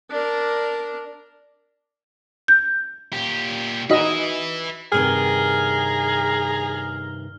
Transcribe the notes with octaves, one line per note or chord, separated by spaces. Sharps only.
D4 A#4
G6
A#2 G4
D#4 F#4 B4 D#5 E5
G2 C3 D#3 G#4 A#5 F6